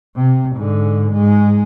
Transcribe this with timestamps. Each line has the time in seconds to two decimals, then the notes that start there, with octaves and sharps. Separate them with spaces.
0.16 C3
0.56 G#2 D3
1.13 G#2 G#3